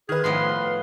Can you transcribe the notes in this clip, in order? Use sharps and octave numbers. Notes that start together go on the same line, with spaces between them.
D#3 G#4 B4
A2 F3 B3 C6